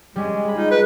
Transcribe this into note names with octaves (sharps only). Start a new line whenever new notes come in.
G3 G#3 C#4
G#4 B5
D#4 F4
B4